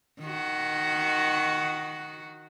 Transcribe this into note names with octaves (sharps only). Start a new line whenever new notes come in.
D#3 F#4